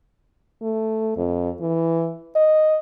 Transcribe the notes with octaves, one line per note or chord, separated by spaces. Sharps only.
A3
F2
E3
D#5